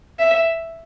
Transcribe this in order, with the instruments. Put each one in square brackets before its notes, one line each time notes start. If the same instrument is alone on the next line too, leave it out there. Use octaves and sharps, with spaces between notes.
[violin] E5